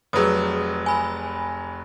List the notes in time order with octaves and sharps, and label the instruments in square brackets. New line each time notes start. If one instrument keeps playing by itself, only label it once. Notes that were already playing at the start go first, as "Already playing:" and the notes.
[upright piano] F1 F#3 [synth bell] G#4 B4 D#6
[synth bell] G#5 B5